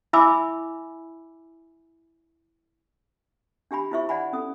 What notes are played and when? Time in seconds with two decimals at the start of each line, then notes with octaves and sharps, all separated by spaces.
0.13 E4 E5 G#5 B5 D6 E6
3.71 D4 G4 G#5 B5
3.91 E4 F4 C5 E5 C#6
4.09 D5 F#5 G#5 B5
4.33 C#4 A4 D#6